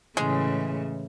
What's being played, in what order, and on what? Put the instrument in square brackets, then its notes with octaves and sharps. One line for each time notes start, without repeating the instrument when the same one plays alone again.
[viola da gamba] A2 C#3 E3 [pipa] G#3